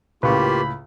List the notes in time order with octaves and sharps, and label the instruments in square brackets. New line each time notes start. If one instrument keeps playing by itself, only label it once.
[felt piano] C#2 A2 [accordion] A#3 F4 G4 [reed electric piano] B4 C#6 [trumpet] B5